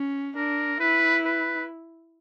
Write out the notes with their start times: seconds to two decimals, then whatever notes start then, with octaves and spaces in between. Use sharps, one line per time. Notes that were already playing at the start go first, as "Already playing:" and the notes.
Already playing: C#4
0.36 D4 A#4
0.80 E4 B4
1.25 B4